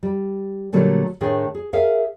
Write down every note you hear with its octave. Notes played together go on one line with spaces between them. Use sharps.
G3
A#2 D3 F#3 G3 A3 A#3
A2 D#3 D4 G#4 G5
G#4
G#4 A#4 E5 F5